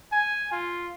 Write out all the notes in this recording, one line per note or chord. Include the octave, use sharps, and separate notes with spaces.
G#5
F4